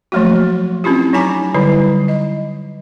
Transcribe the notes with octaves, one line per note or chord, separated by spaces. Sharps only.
F3 F#3 A3 A#3 F#4
C4 C#4 E4 F4 G4
F#3 D#4 G#5 A#5 D6
D3 F#3 G3 E4
D#5